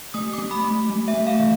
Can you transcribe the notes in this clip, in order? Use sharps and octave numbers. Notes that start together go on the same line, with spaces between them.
A3 D#6
D6
A3
B5
A3
A3
E5
A3
F5
E3